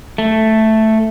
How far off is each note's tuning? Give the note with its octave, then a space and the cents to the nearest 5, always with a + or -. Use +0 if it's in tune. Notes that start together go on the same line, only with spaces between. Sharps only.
A3 +0